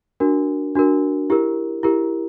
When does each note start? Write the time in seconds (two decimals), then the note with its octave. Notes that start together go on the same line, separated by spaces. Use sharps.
0.20 D4 F#4 A#4
0.75 D4 F#4 A#4
1.30 E4 G4 A#4
1.83 E4 G4 A#4